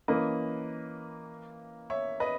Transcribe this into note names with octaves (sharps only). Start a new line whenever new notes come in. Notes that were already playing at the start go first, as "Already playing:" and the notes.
E3 A#3 C#4 B4 D#5
C#5 E5
B4 D#5